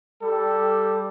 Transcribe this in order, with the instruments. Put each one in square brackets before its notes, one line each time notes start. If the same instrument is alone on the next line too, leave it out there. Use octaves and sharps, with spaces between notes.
[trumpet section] G3 G4 A4